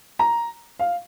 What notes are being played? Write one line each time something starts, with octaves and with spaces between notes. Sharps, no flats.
A#5
F5